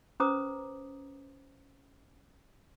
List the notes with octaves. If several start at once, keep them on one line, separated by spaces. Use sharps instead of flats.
C#4 B4 C5 A#5 D6 D#6